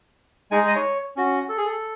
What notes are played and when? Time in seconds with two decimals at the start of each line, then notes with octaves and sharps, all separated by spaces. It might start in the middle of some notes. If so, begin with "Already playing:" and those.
0.51 G#3 D#4 G#4 G#5
0.68 D#5
0.76 C#5
1.17 C#4 F#4
1.49 A4
1.58 G#4
1.65 A4